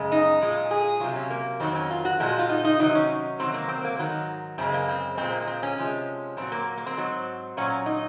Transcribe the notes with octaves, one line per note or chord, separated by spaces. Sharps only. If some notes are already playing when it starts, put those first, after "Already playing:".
Already playing: F#2 C#3 G#3
D#4
A#2 F3 G#3
G#4
C3 F#3 F4
C#4
A#3
F2 D#3 F#3 C4
C#4
F4
F#4
A#2 F3 G#3 F#4
F4
D#4
D#4
C3 D#3 F#3 D#4
C#4
C3 D#3 F#3 C4
A#3
C4
A#3
G#2 D#3 F#3
F#2 C#3 G#3 C4
A#3
C4
A#2 G#3 C4
A#3
C4
C#4
C3 F3 G#3
A#2 F#3 C4
A#3
A#3
C4
G#2 F#3
A#2 F#3 C#4
D#4